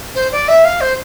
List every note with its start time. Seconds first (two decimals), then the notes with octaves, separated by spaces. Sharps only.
0.15 C5
0.32 D5
0.48 E5
0.65 F5
0.81 C5